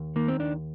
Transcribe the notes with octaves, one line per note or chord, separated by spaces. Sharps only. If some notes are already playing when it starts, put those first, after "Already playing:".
Already playing: D#2
D#3 A#3
C4
D#2 D4